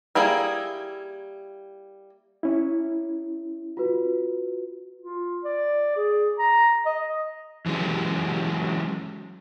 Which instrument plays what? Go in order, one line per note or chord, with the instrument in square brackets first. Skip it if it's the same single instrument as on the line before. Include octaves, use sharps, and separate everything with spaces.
[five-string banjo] G3 A#3 E4 G#4
[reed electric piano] C#4 E4
[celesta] F4 F#4 B4
[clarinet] F4
D5
G#4
A#5
D#5
[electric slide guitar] E3 F#3 G#3 C#4